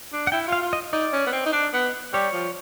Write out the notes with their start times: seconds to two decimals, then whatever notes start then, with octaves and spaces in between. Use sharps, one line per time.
0.13 D4
0.27 F#5
0.32 E4 G5
0.48 F4 F5
0.62 F4
0.73 D#5
0.93 D#4 D5
1.13 C#4
1.27 B3
1.33 C4
1.46 D#4
1.53 D4
1.74 B3
2.13 G3 C#5
2.34 F3